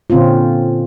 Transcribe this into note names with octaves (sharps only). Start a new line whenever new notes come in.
A#2 D3 C4 C#4 F4